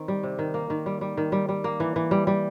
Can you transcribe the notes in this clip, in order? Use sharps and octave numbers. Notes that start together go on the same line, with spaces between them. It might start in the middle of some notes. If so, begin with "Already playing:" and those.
Already playing: D#3 C4
G3
C3
D#3
A#3
D#3
G3
G3
D#3
G3
G3
A#3
E3
E3
G3
G3